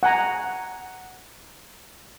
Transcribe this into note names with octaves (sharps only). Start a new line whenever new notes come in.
F#5 G#5 A#5